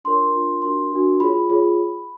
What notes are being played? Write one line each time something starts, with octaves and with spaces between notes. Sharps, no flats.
D4 F4 A#4 C#5 C6
D4 F4 A#4 C#5
D4 F#4 A#4 C6
D4 F#4 A#4
F4 G#4 C#5 B5
F4 G#4 C#5